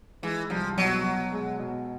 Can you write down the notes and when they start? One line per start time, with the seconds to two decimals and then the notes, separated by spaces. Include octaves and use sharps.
0.23 E3 G#3
0.50 C2 F3
0.77 B2 F#3
1.04 B2
1.32 G#3
1.59 B2